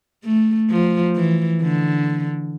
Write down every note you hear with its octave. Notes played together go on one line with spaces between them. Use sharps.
A3
F3
E3
D3